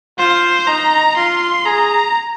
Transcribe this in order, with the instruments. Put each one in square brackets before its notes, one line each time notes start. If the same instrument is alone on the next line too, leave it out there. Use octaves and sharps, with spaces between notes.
[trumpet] F4 [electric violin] C5
[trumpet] D#4 [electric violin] A#5
[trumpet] F4 [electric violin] C6
[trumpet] G#4 [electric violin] A#5